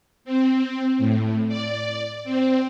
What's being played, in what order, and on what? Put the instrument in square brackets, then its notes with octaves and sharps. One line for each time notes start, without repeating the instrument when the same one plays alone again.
[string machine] C4
A2
D5
C4